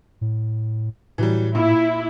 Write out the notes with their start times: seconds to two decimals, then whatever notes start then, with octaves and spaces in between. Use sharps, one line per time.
0.21 A2
1.18 A2 E3 F#3 G3
1.55 A#2 E4